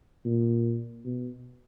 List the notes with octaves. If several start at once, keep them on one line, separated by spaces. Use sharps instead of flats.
A#2
B2